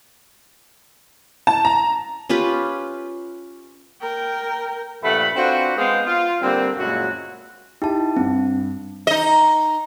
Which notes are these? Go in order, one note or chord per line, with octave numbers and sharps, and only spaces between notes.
A5
A#5
C#4 F4 G4 B4
A#4 G5
G2 A#2 F3 A3 F#5 B5
C4 D4 F4 F#4 B4 C5
G#3 B3 C4 G#4 F5 G5
F4
D3 G3 A#3 C4
F#2 A#2 C#3 G#3 E4 F#4
D#4 E4 G4 A5
G2 C4
D#4 D#5